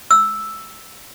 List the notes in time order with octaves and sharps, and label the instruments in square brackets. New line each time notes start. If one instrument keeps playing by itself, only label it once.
[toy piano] E6